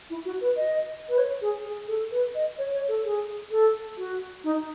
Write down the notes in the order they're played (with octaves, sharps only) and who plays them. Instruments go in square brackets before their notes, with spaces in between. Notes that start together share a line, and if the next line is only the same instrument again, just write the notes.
[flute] E4
F#4
B4
D#5
B4
C#5
G#4
G#4
A4
B4
D#5
C#5
C#5
A4
G#4
A4
F#4
D#4